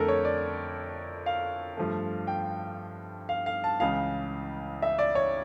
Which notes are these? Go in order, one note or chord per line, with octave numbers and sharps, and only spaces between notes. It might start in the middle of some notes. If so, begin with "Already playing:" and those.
Already playing: F2 D3 A3 A4 A#4
C#5
D5
F5
G2 F3 A3
G5
F5
F5
A5
C#2 C#3 E3 F5
E5
D5
C#5